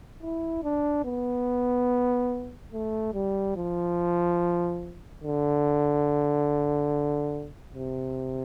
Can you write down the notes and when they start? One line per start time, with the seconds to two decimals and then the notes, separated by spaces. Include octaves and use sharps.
0.22 E4
0.63 D4
1.05 B3
2.73 A3
3.14 G3
3.56 F3
5.24 D3
7.74 C3